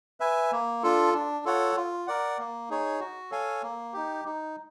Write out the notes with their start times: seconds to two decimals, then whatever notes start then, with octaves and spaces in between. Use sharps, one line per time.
0.20 B4 E5 G#5
0.52 A#3
0.83 D4 F4 A4
1.14 D4
1.45 F4 A4 C#5 F#5
1.76 F4
2.07 A#4 D5 F#5
2.39 A#3
2.70 D#4 G#4 C#5
3.00 F#4
3.31 A4 C#5 F5 G#5
3.63 A#3
3.93 D#4 G4
4.25 D#4